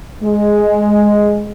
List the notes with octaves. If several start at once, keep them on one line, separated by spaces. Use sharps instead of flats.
G#3